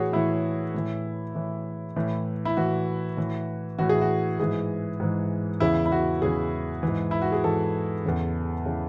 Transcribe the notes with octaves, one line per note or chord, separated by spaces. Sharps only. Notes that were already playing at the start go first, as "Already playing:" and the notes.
Already playing: A2 E3 F#4 G#4 C#5
A2 E3 E4
A2 E3
A2 E3
A2 E3
E4
A2 E3 F#4
A2 E3
A2 E3 F#4
G#4
F#4
G#2 E3 G#4
G#2 E3
E2 C#3 E3 E4
E4
F#4
E2 C#3 E3 G#4
G#2 E3
E4
F#4
G#4
G#2 E3 A4
E2 C#3 E3
C#3 E3